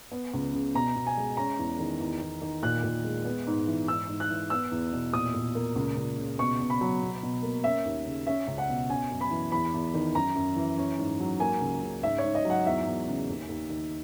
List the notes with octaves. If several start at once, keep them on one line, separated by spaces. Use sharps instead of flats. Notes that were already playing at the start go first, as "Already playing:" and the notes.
B3
C#2
C#3
B2 A#5
B2
G#5
G#3
C#4 A#5
E2
D#3
E2
E2
D#3
A#2 F#6
A#2
G#3
B3
G#2
E3
G#2 E6
G#2
F#6
E3
B3 E6
E2
B2
A#2 D#6
A#2
A#3
C#2
C#2
C#3
B2 C#6
B2
B5
F#3
B2
B2
A#3
C#4 E5
D#2
C#3
C#4 E5
C#2
F#5
B2
C#4 G#5
F#2
B5
E3
E2 B5
E2
D#3
F#2 A#5
F#2
E3
C#4
G#2
F#3
A#3 G#5
C#2
C#3
G#2 E5
C#5
G#2
D#5
F#3 F#5
E2 E5
E2
C#3
D#2
D#2
D#3